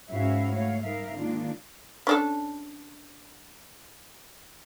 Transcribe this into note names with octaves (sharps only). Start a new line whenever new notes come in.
G#2 C#4 E4 F#4 E5 F5
A3 C#5 F5
G3 D#4 A#4 E5 F5
D#3 G#3 A#3 D4 F4
C#4 D4 A4